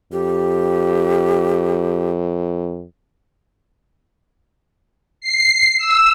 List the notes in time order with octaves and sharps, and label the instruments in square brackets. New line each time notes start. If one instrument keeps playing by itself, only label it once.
[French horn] F2 [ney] G4
[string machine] C7
E6